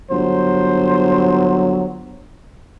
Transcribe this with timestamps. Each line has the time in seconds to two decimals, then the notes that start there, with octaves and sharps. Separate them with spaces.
0.11 G1 F#3 C5